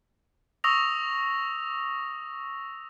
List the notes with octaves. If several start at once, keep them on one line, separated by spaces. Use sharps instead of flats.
C#6 D#6 E6 A#6 F7